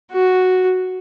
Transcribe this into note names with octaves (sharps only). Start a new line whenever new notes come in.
F#4